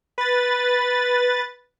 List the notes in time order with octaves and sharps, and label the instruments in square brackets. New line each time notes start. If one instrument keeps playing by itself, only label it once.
[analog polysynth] B4 A6